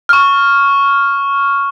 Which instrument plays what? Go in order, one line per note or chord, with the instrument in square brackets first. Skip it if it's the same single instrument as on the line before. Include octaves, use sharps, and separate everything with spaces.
[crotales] C#6 F6